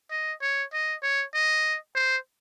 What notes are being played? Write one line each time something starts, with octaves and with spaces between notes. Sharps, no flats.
D#5
C#5
D#5
C#5
D#5
C5